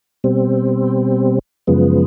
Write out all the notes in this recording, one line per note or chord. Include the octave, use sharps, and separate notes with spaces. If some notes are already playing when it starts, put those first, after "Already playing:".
B2 G3 C4
F#2 C#3 F3 G#3 B3